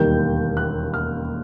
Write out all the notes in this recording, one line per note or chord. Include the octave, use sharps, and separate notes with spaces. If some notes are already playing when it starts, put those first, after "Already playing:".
Already playing: E1 D#2 D#3 G3 G6
F#6
F6